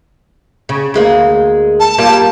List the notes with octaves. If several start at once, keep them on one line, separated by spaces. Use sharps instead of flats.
C#3
D2 G#3 A#3
A5
G3 A#3 F4